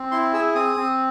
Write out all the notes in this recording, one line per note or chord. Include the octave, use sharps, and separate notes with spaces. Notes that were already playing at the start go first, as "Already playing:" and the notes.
Already playing: C4
E4 C6
G#4 E6
C4 D#6
C4